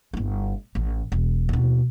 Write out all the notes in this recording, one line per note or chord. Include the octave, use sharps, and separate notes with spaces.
G1 E4
A1
E1
D#2 B2